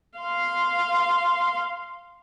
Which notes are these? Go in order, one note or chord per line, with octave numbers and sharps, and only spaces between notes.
F5 C6